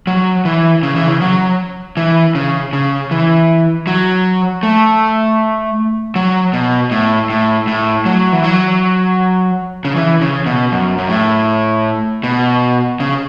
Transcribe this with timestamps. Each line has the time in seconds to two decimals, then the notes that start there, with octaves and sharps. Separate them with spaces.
0.07 F#3
0.45 E3
0.83 C#3
0.96 E3
1.08 C#3
1.21 F#3
1.97 E3
2.35 C#3
2.73 C#3
3.11 E3
3.87 F#3
4.63 A3
6.16 F#3
6.53 B2
6.91 A2
7.30 A2
7.67 A2
8.06 F#3
8.33 E3
8.43 F#3
9.85 C#3
9.96 E3
10.21 C#3
10.46 B2
10.72 F#2
10.98 F#2
11.09 A2
12.23 B2
13.00 C#3